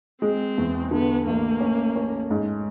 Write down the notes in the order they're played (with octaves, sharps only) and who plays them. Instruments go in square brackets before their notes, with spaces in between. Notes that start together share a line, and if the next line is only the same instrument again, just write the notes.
[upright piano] G#3 [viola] C4
[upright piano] E2
[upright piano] D3 [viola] B3
[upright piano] A1 [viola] A#3
[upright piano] C#4
C#4
G#2